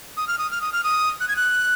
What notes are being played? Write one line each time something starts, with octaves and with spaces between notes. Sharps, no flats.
D#6
F6
D#6
F6
D#6
F6
D#6
F#6
G#6
F#6